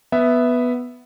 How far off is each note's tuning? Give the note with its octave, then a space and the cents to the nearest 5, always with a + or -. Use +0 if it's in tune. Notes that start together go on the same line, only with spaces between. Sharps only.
B3 +0 E5 +0